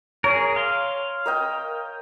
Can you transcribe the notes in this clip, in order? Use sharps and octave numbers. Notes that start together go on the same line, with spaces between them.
G#4 A#4 C#5
F5 C6
A#4 D#5 G5